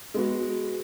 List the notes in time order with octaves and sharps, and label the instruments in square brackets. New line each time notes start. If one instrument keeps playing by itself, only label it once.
[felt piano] G#3 B3 F#4